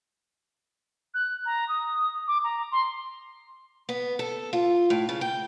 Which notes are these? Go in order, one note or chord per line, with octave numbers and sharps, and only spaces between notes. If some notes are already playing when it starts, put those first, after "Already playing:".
F#6
A#5
D#6
D6
A#5
C6
B3
A4
F4
A2
C#3
G5